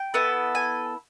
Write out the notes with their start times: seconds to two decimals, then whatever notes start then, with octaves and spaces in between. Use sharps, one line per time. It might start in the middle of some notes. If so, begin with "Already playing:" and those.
Already playing: G5
0.14 B3 E4 A4
0.55 G#5